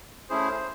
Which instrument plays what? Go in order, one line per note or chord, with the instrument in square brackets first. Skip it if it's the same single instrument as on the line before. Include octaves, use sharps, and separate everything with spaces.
[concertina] A3 C#4 E4 G#4 C5